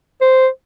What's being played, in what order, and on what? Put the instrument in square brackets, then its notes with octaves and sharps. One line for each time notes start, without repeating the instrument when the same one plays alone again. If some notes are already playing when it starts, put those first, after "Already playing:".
[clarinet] C5